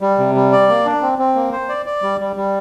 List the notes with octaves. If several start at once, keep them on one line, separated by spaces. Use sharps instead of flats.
G3
C3
G3
D5
A#3
D4
C4
C4
A#3
C5
D5
D5
G3
G3
G3